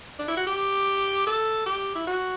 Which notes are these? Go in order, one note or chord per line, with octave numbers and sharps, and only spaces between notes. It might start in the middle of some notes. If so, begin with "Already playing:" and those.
D4
E4
F#4
G4
A4
G4
E4
F#4